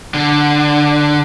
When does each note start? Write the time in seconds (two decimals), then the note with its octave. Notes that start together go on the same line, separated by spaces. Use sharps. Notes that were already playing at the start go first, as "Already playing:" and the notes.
0.14 D3